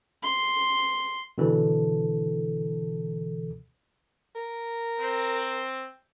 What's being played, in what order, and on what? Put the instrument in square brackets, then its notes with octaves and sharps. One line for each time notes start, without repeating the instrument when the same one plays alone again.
[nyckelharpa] C6
[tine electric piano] B2 D3 E3 A4
[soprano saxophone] A#4
[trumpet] C4